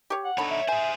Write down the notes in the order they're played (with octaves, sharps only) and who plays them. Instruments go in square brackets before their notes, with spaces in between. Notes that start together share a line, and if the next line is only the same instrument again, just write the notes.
[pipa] G4 C#5
[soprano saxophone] F#5
[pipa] D3 B5 [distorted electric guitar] D#4 C#5
[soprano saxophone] E5
[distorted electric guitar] G#4 C5 [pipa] G#5